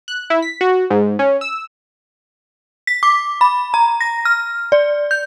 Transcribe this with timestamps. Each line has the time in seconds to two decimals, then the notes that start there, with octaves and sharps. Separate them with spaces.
0.08 F#6
0.30 E4
0.42 B6
0.61 F#4
0.90 G#2
1.19 C#4
1.41 E6
2.87 B6
3.03 D6
3.41 B5
3.74 A#5
4.01 A#6
4.25 F6
4.72 D5
5.11 G6